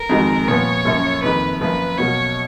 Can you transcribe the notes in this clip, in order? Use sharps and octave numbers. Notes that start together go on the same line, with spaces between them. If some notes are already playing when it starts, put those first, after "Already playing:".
Already playing: A#4
F2 D#3 G#3 D#4 F#4
A#2 F3 B3 C#5
F#2 F3 A#3 C#4
F2 D#3 A#3 B4
F#2 F3 A#3 B4
B2 F#3 A#3 C#5